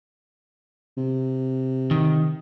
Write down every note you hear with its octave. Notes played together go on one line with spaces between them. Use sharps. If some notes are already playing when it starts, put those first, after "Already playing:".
C3
D#3